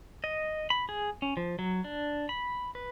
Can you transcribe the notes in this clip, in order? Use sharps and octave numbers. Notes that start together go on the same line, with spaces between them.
D#5
B5
G#4
C#4
F3
F#3
D4
B5
B4